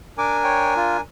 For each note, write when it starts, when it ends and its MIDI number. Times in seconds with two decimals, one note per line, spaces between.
0.18 1.01 62
0.18 1.01 70
0.18 1.01 80
0.18 0.37 86
0.44 0.74 73
0.44 0.74 79
0.76 0.97 65